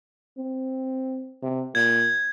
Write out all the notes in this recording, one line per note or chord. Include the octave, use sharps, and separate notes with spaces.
C4
C3
A#2 G#6